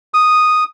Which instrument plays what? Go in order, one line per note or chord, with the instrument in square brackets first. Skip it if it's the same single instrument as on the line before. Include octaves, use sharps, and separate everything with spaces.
[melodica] D#6